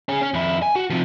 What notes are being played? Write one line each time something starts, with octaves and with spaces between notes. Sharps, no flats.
C#4 G#4
C#4
F2 E4
G#5
F#4
C3 F3